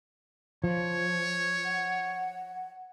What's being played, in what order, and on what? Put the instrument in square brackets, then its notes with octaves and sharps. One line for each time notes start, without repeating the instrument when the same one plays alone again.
[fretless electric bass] F3 [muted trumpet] C#5
[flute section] F#5